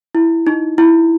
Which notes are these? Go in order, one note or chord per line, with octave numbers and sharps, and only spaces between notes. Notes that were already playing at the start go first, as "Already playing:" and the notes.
E4
D#4
E4